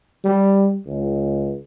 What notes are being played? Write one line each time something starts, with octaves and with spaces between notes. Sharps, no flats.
G3
C#2